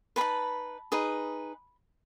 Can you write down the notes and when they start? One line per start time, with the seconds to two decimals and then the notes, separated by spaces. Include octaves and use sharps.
0.16 G#4 B4 A5 B5
0.21 D#4
0.92 D#4 G#4 B4